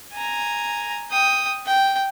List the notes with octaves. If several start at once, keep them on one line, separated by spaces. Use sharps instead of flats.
G#5 A#5
G5 D#6
G5